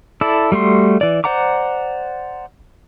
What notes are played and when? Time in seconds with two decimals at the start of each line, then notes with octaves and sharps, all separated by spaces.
0.21 E4 A4 D5
0.52 G3 A3 F#4 C6
1.01 E3 D5
1.24 C5 D5 F#5 A#5 D6